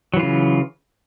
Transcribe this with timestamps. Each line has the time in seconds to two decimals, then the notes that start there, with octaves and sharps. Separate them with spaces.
0.14 F#3
0.16 E3
0.19 F4
0.22 C#3